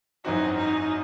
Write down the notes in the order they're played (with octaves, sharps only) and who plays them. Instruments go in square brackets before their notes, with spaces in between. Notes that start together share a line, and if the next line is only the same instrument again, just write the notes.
[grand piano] G#1 F#2 E3 C4 F#4 [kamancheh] D#4
[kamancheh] D#4